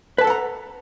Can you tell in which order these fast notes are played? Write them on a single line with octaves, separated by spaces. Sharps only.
B4 A5 A4 F#5 A#5